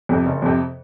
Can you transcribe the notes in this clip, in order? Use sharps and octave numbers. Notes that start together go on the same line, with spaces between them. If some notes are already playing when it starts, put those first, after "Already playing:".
F2 C3
F#1
F2 C3